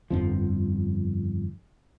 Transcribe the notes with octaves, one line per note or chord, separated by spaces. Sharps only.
G1 F2 F3